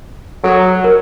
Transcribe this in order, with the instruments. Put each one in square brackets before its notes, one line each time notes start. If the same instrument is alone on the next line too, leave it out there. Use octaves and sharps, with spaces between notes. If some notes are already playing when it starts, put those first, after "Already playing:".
[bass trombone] F#3 [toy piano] A4
[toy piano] A#4